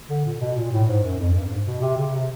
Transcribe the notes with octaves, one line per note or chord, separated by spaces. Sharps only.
D3
A#2
B2
A#2
A2
G#2
F#2
F2
G2
G#2
B2
C3
C#3
C3